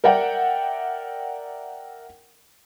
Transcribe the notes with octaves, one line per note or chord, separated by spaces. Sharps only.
A#4 D5 E5 F#5 G5